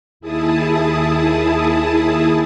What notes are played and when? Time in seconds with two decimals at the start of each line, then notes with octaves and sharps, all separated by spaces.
0.20 D#2 E4 G#4 A5 D#6